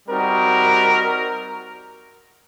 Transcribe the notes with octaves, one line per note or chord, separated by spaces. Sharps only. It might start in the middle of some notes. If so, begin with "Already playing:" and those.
G3 C4 D#4 F#4 A#4